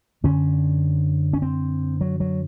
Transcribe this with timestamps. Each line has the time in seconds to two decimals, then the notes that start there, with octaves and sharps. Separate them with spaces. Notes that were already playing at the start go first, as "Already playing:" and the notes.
0.24 F#2 D3 C#4
1.33 C#4
1.42 C4
2.01 F#3
2.20 F#3